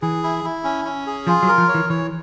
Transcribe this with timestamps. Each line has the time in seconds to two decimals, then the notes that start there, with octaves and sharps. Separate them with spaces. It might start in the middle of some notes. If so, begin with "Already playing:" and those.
0.02 E3 G#4
0.23 E4
0.44 E4
0.64 C#4
0.85 C#4
1.07 G#4
1.27 F3 F4
1.43 F#3
1.48 A#4
1.58 F3
1.68 C#5
1.74 E3
1.90 E3 C#5